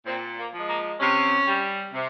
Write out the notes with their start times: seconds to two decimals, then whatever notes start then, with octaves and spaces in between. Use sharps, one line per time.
0.06 A#2 C4
0.37 A#3
0.53 F3 G#3
0.68 A#3
0.99 C3 C#4
1.47 G3
1.93 C3